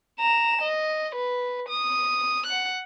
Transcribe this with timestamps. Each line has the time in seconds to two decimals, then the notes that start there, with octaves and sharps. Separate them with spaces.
0.20 A#5 E7
0.62 D#5
1.15 B4
1.69 D#6
2.46 F#5 F#6